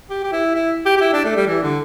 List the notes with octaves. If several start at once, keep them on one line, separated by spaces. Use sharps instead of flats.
G4
G4
E4
E4
G4
G4
E4
D4
A3
G3
E3
D3